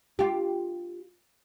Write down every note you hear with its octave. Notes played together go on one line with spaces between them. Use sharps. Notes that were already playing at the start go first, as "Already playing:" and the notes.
F4 G4